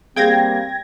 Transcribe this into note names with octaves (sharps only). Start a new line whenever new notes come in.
G3 A#3 C4 G#4 F5 G5 G#6 A#6